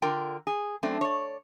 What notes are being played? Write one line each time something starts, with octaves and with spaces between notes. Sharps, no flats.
D3 F4 A#4 G5
G#4
F#2 A3 C4 D4
C#5 D5